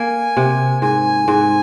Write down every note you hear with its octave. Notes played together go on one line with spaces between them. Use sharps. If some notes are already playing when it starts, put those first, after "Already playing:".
Already playing: A#3 G#5
C3
G#2 G#5
G#2